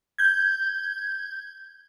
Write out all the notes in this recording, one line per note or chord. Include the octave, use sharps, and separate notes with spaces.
G6 G#6